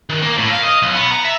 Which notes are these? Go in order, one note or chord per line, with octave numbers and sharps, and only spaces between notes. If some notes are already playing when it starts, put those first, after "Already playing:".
D#3
A#3
A2
F5
D#5
B1
B3
A#5
E5